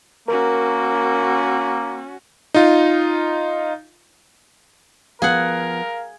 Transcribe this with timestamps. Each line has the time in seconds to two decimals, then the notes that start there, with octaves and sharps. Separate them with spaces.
0.28 A#3 C#4 F#4 A#4
2.54 D#4 F4
5.22 F3 B3 G#4 A#4 F5 F#5